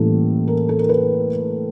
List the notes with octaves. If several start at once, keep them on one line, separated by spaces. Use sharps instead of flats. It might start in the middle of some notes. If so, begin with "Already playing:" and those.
Already playing: A2 E3 G3 A#3 C#4 A4
A#4
A4
A#4
B4